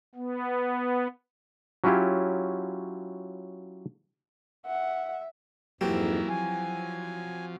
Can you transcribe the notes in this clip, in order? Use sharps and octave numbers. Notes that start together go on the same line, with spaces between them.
B3
F#3 C#4 E4 F4 G4
E5 F#5
F2 G#2 E3 F#3 A#3 C4 E4 G4
F3 G#5